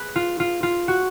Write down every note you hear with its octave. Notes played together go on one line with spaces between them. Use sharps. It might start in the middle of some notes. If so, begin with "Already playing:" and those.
Already playing: G#4 B4
F4
F4
F4
F#4